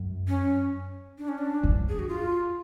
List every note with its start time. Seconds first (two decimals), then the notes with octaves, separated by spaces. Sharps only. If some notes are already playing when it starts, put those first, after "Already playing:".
Already playing: F#2
0.28 C#4
1.18 D4
1.28 C#4
1.38 D4
1.63 F2
1.89 G#4
1.99 F#4
2.08 F4